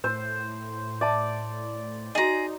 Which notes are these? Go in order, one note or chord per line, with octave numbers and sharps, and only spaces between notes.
A2 A#4 C5
D5 E5 A5
D#4 F#4 G#4 D#5 A#5